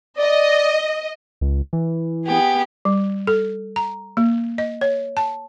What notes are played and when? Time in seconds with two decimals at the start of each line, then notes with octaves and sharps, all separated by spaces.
0.18 D5 D#5
1.41 C#2
1.73 E3
2.25 B3 G4 G#4
2.85 G3
3.27 A4
3.76 A#5
4.17 A#3
4.58 D#5
4.81 C#5
5.17 A5